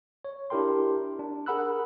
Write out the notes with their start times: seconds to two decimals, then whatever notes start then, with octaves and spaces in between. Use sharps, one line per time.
0.25 C#5
0.50 D4 E4 G4 A#4 G5 C6
1.19 D4
1.46 G#4 A#4 F#5 B5 E6 F#6